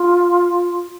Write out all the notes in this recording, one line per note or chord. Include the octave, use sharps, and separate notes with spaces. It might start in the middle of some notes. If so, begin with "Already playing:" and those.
Already playing: F4